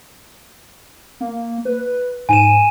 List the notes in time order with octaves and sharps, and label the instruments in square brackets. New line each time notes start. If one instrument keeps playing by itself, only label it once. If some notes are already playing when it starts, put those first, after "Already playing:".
[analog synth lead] A#3
B4
[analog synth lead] G#2 [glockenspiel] G#5 D#7 E7